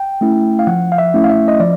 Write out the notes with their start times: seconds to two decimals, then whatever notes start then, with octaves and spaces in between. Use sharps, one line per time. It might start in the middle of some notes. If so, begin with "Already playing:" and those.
Already playing: G5
0.21 A3 C#4 E4
0.59 F5
0.67 F3 F#5
0.92 F5
0.98 E5
1.14 A3 C#4 E4
1.24 F5
1.30 E5
1.48 D#5
1.60 F3 D5